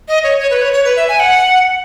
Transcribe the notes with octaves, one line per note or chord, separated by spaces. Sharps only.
D#5
C#5
C#5
B4
C#5
C#5
B4
E5
G#5
F#5